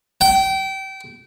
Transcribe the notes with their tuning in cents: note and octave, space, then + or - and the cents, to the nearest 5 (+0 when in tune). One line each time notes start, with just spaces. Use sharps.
G5 -25